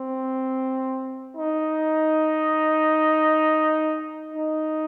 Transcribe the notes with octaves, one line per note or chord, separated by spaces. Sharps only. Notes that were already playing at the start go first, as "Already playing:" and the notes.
Already playing: C4
D#4
D#4